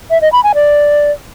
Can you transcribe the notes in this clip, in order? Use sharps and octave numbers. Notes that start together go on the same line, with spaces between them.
E5
D#5
B5
G#5
D5